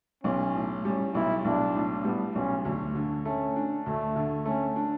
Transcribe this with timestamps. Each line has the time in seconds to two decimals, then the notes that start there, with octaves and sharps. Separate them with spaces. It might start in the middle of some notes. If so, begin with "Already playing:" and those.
0.24 B1 C#4
0.55 A2
0.84 G3 C#4
1.14 B1 E4
1.44 B1 D4
1.75 A2
2.05 G3 B3
2.35 B1 C#4
2.65 D2
2.95 D3
3.25 A3 C#4
3.56 D4
3.86 D2 A3
4.16 D3
4.46 A3 C#4
4.76 D4